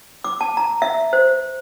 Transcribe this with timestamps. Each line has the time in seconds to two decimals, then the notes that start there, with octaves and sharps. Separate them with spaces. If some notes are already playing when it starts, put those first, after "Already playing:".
0.24 D6
0.41 A5
0.57 A#5
0.82 E5
1.13 C5